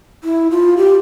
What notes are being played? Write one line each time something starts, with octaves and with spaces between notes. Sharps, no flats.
E4
F4
G4